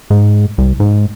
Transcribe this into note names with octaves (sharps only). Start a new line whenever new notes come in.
G#2
C2
G#2